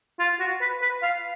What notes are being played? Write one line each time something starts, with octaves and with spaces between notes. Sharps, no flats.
F4
F#4
B4
B4
F5